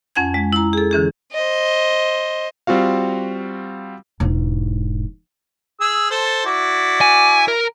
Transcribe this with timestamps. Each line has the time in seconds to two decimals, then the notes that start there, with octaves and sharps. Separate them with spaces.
0.15 F2 C#4 F#5 G#5 G#6
0.34 G#3
0.53 E4 A#5
0.73 G#4 A4
0.91 D3 E3 C#4 G#4
1.32 C5 D#5
2.67 G3 C4 F4 F#4 F5
4.20 E1 G#2
5.81 G#4 E6
6.11 A4 C5
6.46 E4 F#4 D5
7.01 G#5
7.48 A#4